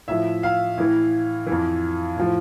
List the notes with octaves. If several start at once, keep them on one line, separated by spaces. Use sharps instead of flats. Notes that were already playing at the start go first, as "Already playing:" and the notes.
A2 F3 E5
F5
A2 E3
F2 E3
A2 F3